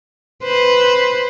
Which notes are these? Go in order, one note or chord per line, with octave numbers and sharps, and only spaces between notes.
B4 C5